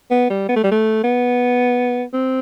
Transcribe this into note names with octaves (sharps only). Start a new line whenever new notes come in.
B3
G3
B3
A3
G3
A3
B3
C4